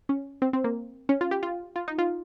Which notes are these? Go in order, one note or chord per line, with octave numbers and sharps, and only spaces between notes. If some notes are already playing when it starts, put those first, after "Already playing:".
C#4
C4
C4
A#3
C#4
F4
G4
F4
F4
D#4
F4